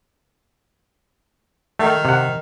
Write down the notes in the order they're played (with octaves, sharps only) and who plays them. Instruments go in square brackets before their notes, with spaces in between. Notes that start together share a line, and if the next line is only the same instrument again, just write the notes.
[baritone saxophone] D#3 [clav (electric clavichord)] A3
[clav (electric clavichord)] C3 F#5